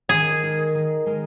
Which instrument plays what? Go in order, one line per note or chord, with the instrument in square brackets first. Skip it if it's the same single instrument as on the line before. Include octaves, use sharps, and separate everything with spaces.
[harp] D#3 [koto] G#4
[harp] G#3 D#4 A#4
D#3
G#3 D#4 A#4